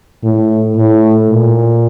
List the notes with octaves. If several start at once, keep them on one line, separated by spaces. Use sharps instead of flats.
A2
A2
A#2